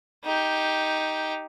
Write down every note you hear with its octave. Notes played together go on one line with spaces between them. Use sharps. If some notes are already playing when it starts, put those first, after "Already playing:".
D#4 G4